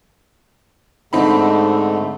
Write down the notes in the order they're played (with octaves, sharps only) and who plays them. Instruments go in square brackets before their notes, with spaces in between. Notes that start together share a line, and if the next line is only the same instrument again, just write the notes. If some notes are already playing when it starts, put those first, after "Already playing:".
[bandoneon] G#2 D3 A3 [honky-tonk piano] C4 D#4 B5